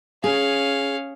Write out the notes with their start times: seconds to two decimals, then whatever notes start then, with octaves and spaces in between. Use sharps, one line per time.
0.24 C#4 G#4 F5